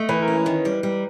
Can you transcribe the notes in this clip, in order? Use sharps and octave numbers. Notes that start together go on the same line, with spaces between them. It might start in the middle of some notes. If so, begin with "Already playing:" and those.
Already playing: A3 D#5
E3 B4
A#4
C#4
D#3
G3
G3